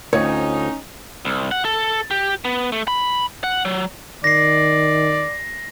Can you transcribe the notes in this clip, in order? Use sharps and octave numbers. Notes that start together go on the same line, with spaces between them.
D2 C4 C#4 D#4 F4 C#5
C2
F#5
A4
G4
B3
A3
B5
F#5
F#3
D#3 D5 A#6 C7